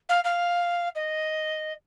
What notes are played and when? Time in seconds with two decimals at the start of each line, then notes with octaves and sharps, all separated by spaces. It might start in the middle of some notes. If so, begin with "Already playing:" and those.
0.09 F5
0.24 F5
0.95 D#5